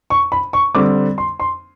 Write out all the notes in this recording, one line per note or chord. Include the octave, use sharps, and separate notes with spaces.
C#6
B5
C#6
D3 G3 C4 D6
C6
C6